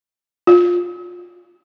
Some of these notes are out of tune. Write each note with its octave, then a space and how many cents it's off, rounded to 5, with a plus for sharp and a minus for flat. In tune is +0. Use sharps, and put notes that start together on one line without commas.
F4 +20